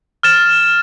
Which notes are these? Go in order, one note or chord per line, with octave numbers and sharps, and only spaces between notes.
F6 A6 E7